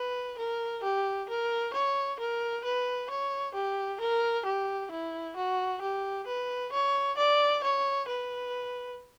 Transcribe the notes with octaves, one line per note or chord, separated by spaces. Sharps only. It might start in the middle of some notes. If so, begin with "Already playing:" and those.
Already playing: B4
A#4
G4
A#4
C#5
A#4
B4
C#5
G4
A#4
G4
E4
F#4
G4
B4
C#5
D5
C#5
B4